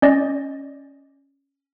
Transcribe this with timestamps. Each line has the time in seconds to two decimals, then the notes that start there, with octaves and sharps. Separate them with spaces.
0.02 C#4 D5 D#5